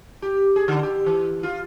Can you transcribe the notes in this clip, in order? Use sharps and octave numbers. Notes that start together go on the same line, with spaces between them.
G4
G#4
D3
G4
E3
F4